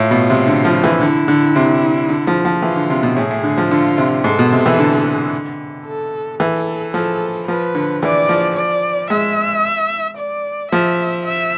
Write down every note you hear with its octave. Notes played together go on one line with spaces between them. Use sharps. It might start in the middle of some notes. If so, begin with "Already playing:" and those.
Already playing: A2 F4
B2
C3
D3
F3
E3
D3 E4
D3
C3
D3
F3
F3
E3 F4
D3
C3
B2
A2 G#4
A2
D3
F3
D3 F4
C3
G#2 A4
B2
C3
E3
D3
A4
E3 A4
F3 A4
F3 B4
D3
E3 D5
F3
D5
G#3 E5
D5
F3 E5
E5